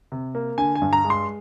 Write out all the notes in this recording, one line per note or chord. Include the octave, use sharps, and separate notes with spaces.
C3
A#3
D3 G#5
G#5
G2
A#5
G#3
C6